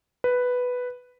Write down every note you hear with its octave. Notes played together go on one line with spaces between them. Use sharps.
B4